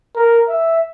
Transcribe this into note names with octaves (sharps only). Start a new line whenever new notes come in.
A#4
E5